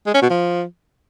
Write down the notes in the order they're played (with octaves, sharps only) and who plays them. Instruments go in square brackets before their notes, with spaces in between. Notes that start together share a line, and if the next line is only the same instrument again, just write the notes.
[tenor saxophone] G#3
C#4
B2
F3